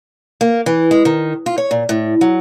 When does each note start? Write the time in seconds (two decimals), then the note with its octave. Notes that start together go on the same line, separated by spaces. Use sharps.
0.41 A#3
0.66 E3
0.91 G#3
1.05 D#3
1.46 F4
1.58 C#5
1.71 A#2
1.89 A2
2.21 F#3